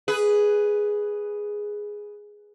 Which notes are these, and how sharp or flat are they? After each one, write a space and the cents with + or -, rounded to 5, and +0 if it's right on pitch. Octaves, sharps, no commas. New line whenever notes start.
G#4 +0 B4 +0